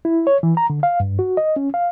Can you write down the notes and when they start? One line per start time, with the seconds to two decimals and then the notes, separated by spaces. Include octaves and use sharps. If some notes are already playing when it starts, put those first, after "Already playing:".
0.05 E4
0.27 C#5
0.43 E3
0.57 A#5
0.70 D3
0.83 F5
1.00 G2
1.19 F#4
1.37 D#5
1.56 C#4
1.74 F5